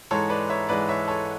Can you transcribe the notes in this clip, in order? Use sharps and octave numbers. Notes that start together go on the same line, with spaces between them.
G#2 E3 G#3 A4 C#5
B4 D5
C#5 E5
G#2 E3 G#3 B4 D5
C#5 E5
A4 C#5